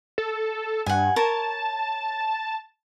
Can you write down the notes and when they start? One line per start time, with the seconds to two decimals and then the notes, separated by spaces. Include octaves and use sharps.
0.18 A4
0.86 G2 F#5 G#5
1.16 A#4 C#5 A5